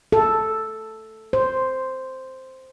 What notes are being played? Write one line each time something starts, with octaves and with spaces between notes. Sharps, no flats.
A4
C5